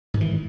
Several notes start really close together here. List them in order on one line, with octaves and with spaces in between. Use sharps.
G#2 D#3 E3